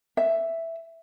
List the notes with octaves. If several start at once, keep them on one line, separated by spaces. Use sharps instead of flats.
E5